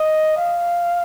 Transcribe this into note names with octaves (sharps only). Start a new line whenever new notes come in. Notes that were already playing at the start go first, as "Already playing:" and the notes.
Already playing: D#5
F5